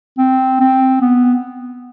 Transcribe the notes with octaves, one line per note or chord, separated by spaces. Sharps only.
C4
C4
B3